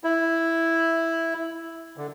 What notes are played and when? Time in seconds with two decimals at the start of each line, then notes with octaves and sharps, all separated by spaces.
0.04 E4
1.97 D3